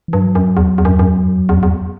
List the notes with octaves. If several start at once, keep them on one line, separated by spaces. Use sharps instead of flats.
E3
G2 F#3
F#2
E2
E2
F#2
E2
F#2
E2
F#2
E2
F#2
E2
F#2
E2
F#2
E2